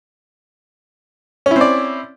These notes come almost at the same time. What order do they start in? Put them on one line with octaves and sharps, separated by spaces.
C#4 E4 C4 D5